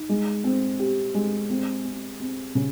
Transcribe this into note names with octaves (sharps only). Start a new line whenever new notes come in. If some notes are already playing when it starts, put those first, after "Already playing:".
Already playing: D#4
G#3
C4
G4
G#3
C4
C4
C4
C#3